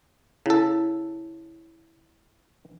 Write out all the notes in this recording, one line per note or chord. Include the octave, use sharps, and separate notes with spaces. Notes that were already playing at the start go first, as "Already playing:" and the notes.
C#3 E4 A4